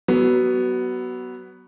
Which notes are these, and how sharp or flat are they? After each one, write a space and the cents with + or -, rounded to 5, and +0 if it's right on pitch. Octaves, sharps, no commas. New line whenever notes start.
F#3 +25 B3 +0